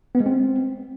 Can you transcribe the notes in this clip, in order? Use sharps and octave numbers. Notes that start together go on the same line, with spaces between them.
B3
G#3
C4